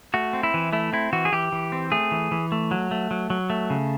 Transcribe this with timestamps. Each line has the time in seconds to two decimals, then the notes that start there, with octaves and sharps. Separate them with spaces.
0.14 A3 F#4
0.33 C4
0.43 E4
0.54 E3
0.73 A3 E4
0.93 C4 E4
1.13 E3 F#4
1.25 G#4
1.32 E3 G4
1.52 E3
1.72 C4
1.92 A3 G#4
2.11 E3
2.31 E3
2.52 A3
2.71 F#3
2.91 A3
3.11 F#3
3.30 F#3
3.50 A3
3.70 C#3